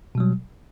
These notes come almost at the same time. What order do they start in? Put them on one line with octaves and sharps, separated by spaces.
B2 G3 F#3